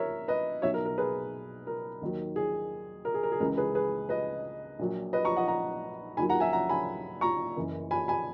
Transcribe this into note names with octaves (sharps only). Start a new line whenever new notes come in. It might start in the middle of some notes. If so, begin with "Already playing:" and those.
Already playing: A#4 C#5 E5
B4 D#5
B1 B2 F#3 C#5 E5
A#4
A#4
G#4 B4
A#4
D#2 D#3 F#3
G#4
A#4
G#4
A#4
G#4
C#2 C#3 E3 A#4
G#4 B4
G#4 B4
B4 D#5
A#1 A#2 F#3
B4 D#5
A#5 C#6
D#5 F#5
F#5 A#5
D#2 D#3 F#3 G#5 B5
F#5 A#5
E5 G#5
F#5 A#5
G#5 B5
A#5 C#6
F#1 F#2 E3
G#5 B5
G#5 B5